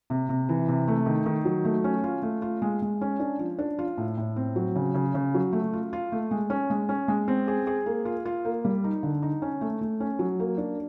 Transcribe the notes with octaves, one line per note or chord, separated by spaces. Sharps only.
C3
C3
E3
C3
A3
D#3
D#3
F#3
A3
C#4
F4
A3
F4
G#3
G#3
C#4
D4
F3
D4
F4
A2
A2
C4
F#3
C#3
C#3
C#3
F#3
A3
F4
F4
A3
G#3
C#4
G#3
C#4
G#3
C4
G#4
G#4
A#3
F4
F4
A#3
G3
D#4
D3
D#4
C#4
A3
A3
C#4
F#3
A#3
D4